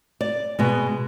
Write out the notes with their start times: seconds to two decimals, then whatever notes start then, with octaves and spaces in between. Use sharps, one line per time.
0.21 D5
0.59 B2 G#3 B3